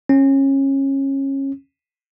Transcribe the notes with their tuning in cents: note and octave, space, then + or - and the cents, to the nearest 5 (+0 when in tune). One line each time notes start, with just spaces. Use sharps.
C#4 -25